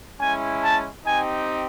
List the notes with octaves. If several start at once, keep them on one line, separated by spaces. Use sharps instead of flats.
G#3 C#4 E4 G#5
A5
C4 D#4 G4 G#5